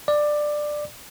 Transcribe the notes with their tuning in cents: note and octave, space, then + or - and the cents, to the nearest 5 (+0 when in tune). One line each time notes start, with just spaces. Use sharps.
D5 +15